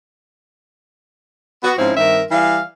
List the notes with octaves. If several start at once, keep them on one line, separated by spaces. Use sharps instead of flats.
B3 F#4
G#2 F3 C4 C#4 E4
G2 D#3 C4 A#4 E5
E3 G3 F5